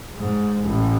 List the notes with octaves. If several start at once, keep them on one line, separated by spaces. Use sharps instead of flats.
G#2
A1